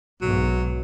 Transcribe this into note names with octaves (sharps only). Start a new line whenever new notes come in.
B1 G#2 F#3